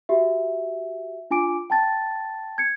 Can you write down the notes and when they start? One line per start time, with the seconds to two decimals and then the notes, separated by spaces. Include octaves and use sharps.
0.09 F#4 G4 E5
1.31 D4 F4 G#5 D6 D7
1.70 G5 A5 A6
2.58 G#6 C#7